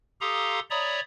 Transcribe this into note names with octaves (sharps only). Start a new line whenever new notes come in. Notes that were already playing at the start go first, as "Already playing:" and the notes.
G4 A4 F5 A#5 C6 D#6
C#5 D5 E5 A#5 B5 D#6